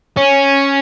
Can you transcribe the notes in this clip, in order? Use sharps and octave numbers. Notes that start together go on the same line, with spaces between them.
C#4